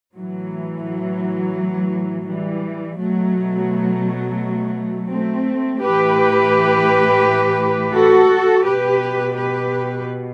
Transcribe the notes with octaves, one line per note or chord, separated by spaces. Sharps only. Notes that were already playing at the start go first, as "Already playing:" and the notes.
A2 E3 F#3
F#3
E3 G3
B2 F#3 A3
A3 C4
A2 E3 G4 B4
F#4 A4
B2 G4 B4
G4 B4